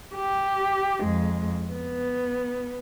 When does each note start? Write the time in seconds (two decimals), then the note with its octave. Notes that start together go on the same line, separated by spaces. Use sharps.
0.15 G4
1.02 F2 G#3
1.72 B3